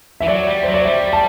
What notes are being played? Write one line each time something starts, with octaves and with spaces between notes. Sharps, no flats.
E3 E5
F#3 D5
G3
F#3 C5
D5
G3 E5
A5